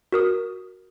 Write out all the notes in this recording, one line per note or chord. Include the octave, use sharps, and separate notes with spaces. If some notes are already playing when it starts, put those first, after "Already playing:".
F#4 A#4 D#6